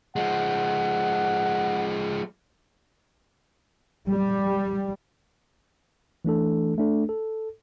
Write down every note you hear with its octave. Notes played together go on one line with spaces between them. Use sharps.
F3 G#3 F#5
G3
E3 A3 D4 A4
A3 D4 A4
A4